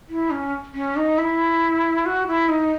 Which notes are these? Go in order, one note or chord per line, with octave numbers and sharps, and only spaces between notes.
E4
C#4
C#4
D#4
E4
F#4
E4
D#4